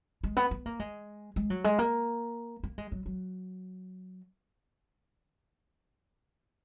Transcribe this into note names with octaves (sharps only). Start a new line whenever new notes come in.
G#3
B3
B3
A#3
G#3
G#3
F#3
G#3
A#3
A#3
G#3
F#3
F#3